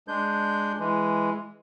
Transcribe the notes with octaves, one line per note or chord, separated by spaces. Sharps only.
G#3 D4 G6
E3 G#3